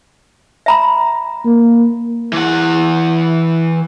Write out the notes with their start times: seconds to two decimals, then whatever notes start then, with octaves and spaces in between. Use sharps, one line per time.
0.66 E5 A#5 B5
1.45 A#3
2.33 E3 F#5